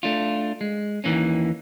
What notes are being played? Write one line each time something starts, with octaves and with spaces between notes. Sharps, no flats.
A3 D4 F4
G#3
D#2 D#3 E3 A#3 C#4